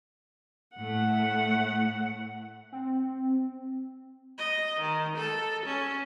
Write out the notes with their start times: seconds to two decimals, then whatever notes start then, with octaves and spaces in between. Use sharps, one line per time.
0.77 A2 A3 F#5
2.72 C4
4.38 D#5
4.80 D#3
5.17 A4
5.65 C#4